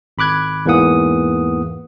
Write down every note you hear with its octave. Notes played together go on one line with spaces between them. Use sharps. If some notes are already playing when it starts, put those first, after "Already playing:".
G#1 B5 D6 F#6 G#6
E2 G#2 E3 A#3 F#5 D#6